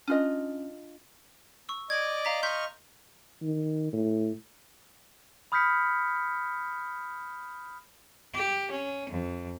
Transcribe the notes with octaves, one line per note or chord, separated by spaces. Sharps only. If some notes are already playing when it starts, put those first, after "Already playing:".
C#4 D4 F4 D#5
C#6 E6
D5 D#5 D6 G#6
F5 A#5 B6
D#5 C6 C#6 F6 G6 B6
D#3
A2
B5 D#6 F6 G6 B6 C#7
G4
C#4
F2